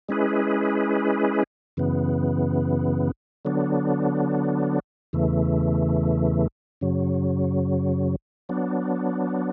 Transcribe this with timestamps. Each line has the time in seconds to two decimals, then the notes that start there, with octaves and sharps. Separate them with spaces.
0.09 G#3 C#4 E4 G#4 B4
1.77 F#2 C#3 E3 B3
3.45 D3 F#3 B3 D4
5.13 E2 C#3 E3 A3
6.81 F#2 C#3 F#3
8.49 F#3 B3 D4